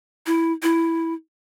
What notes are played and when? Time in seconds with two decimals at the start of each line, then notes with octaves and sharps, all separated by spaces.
0.26 E4
0.62 E4